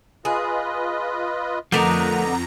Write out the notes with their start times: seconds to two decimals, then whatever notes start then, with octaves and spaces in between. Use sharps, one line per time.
0.25 F4 G#4 B4 D#5
1.72 F2 D3 F3 A3 B3 D#4 A#4 A#5